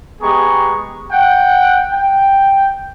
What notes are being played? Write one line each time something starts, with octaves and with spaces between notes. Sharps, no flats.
G#3 B3 G4 G#4 A#5 C#6
F#5 G5
G5